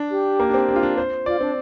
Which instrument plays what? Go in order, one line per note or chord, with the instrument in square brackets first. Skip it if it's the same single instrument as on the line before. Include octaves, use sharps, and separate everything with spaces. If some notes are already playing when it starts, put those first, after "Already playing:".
Already playing: [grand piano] D4
[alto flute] G4
[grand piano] A#3
D4
C4
D4
F4
D4
C5
[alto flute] F4 [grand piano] D5
[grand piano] C4 [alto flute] D4